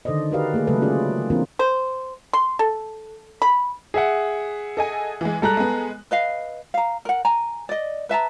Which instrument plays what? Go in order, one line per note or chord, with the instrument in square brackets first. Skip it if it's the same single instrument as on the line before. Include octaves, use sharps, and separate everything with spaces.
[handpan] D3 D#3 A4 C5 D5 D#5
F#4 G4 A#4 B4 D5 F5
A3 A#3 G#4
C#3 F#3 G#3 A3 A4 B4
A3 C#4 F4 G#4 D5
E3 A#3 C4 D4 F4 A#4
[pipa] C5
C6
A4
B5
[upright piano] G#4 E5 F#5
[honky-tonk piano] A4 D#5 G#5
E3 G#3
[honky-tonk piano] G3 G#3 [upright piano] A4 A#5 F#6
[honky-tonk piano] G#3 B3
[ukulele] B4 D#5 F5
F5 A#5
A#4 F#5
G#5 A#5
D5 D#5
B4 E5 A5 A#5